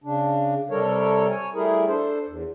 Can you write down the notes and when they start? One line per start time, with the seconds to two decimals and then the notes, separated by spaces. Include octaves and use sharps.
0.04 C#3 D4
0.70 C3 G3 A4 A#4 C#5
1.31 C#5 G#5
1.54 G3 A3 E4 G#4 A#4
1.88 D4 A4 C5
2.27 E2